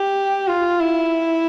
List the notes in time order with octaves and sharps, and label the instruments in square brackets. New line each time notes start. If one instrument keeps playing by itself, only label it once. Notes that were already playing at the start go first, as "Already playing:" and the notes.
Already playing: [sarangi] G4
F4
E4